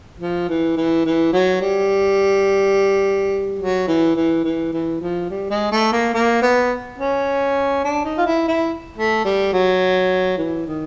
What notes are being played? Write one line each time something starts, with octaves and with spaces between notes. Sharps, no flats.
F3
E3
E3
E3
F#3
G3
F#3
E3
E3
E3
E3
F3
G3
G#3
A3
A#3
A#3
B3
C#4
D4
D#4
F4
E4
E4
A3
G3
F#3
E3
D#3